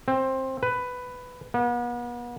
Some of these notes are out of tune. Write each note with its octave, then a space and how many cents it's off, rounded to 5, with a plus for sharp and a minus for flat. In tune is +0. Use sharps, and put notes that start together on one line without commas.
C4 +15
B4 +10
B3 -40